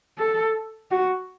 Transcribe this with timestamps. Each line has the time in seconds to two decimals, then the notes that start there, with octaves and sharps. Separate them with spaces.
0.18 A4
0.91 F#4